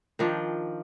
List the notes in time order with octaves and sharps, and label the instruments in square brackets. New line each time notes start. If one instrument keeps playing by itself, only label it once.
[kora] D#3 F3 D4 G5